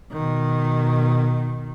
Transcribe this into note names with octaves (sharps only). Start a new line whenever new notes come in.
B2 D#3